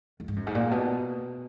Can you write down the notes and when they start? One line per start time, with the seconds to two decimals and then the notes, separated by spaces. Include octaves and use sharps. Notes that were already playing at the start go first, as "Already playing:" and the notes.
0.20 F2
0.28 G#2
0.36 F#2
0.47 G#2
0.55 A#2
0.71 B2